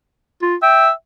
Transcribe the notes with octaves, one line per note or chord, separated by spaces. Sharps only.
F4
E5 G5